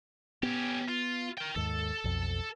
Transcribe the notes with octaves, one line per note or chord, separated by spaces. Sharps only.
B3 C#4 G4
F4
A#4 G5
D#2 G#2 A4
B1 F2